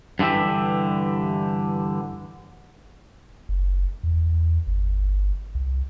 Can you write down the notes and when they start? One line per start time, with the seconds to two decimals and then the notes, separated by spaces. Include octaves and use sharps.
0.19 G2 D3 E3 G4 E5
3.49 F#1
4.03 E2
4.67 G1
5.55 C2